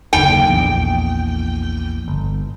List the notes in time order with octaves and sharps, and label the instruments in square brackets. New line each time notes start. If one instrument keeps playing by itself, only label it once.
[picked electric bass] F#1 D#2 D3 [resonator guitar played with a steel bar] G5
[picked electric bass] A#1 E2
G1